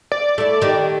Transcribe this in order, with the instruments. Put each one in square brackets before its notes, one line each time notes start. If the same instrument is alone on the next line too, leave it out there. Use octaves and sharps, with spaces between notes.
[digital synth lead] D5
[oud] A3 E4
D#3 G3